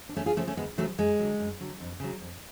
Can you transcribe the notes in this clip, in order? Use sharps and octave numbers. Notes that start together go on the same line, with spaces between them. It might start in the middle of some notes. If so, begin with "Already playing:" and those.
D4
D2 A3 C#4
F4 G#4
C#3 F3 A3 C#4
A3 C#4
D2 G#3 B3
C#3 F3 F#3 A3
F#2 G#3
D3 F#3
F#2
D3 F#3
F2
C#3 F#3
F2